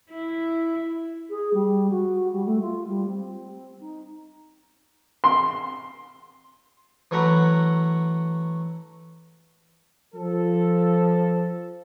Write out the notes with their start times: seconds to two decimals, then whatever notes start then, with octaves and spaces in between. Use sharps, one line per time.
0.11 E4
1.29 G#4
1.53 G3
1.90 F#4
2.32 G3
2.45 A3
2.61 F4
2.87 G3
3.06 C4
3.80 D#4
5.24 C6
7.11 E3 F#3 A3 F#5 A#5 B5
10.15 F3 A4